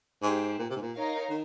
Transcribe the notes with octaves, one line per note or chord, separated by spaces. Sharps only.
G#2 G4 C5 G5
A#2
C3
G#2
A#2
D#4 A#4 C#5 F5
D#3